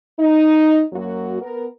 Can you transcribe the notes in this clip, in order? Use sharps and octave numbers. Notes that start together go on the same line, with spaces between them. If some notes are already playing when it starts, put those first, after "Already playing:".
D#4
F#2 F#3 A#3 F#4
B3 A#4